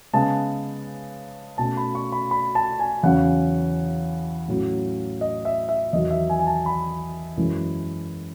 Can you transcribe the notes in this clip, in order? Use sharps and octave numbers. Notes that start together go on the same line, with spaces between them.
C#3 G#3 B3 A5
B2 A3 C#4 A5
B5
C#6
B5
B5
A5
G#5
E2 C#3 F#3 C#4 F#5
A2 F#3 C#4
D#5
E5
E5
E2 D#3 F#3 D#5
E5
G#5
G#5
A5
B5
F#2 E3 G#3 C#4